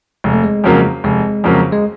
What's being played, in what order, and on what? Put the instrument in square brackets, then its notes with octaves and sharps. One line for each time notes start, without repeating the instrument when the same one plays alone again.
[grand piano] F1 [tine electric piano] G#3
[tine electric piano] A3
G#3
[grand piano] F2 C#3 F#3 A#3
[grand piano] F1 [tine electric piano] G#3
[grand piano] F2 C#3 F#3 A#3
[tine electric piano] G#3